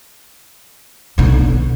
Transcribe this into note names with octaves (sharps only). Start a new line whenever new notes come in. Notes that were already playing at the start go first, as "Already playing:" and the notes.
B1 D3